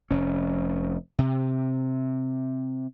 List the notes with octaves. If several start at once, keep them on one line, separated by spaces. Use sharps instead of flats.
F1 C#4
C3